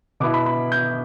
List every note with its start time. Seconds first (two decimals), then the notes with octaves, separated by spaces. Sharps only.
0.20 B2 B3 E4 D6
0.34 B5
0.46 B5
0.72 G6